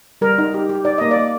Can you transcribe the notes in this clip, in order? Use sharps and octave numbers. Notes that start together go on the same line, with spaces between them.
G3 A#4
D#4
G4
G4
D#4 D5
A#3 D#5
D5
A#3